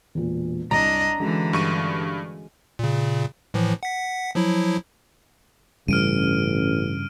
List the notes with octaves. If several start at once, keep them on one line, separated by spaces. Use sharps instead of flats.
E1 A#2
C2 D4 D#5 A#5
D3 E3 G#3 C#4 F#4
G2 C#6 D#7
A#2 C#3
A2 E3 F3
F#5 B6
F3 F#3 E4
A1 G2 C#3 G3 F6 D7 D#7